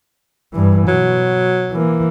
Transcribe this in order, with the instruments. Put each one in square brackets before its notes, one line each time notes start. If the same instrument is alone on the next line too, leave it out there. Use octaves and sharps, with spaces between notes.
[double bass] G2 E3
[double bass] B2 [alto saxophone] F#3
[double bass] E3 A#3